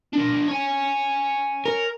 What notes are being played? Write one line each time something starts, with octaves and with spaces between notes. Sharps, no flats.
D4 A#4
C#5 G#5
A#4